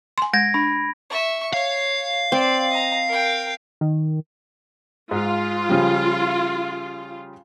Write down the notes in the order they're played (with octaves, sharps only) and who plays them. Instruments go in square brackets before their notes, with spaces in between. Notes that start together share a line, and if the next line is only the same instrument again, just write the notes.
[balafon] G#5 C6
[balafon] G#3 [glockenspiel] G#6 A#6 D7
[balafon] D4 [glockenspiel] B5
[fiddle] E5 C#6
[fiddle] C#5 [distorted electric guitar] F5
[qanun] C4 [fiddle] D5
[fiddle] D#5 A#5
A#4 G5
[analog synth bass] D#3
[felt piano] G#2 [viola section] F4
[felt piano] C#3 F3 G3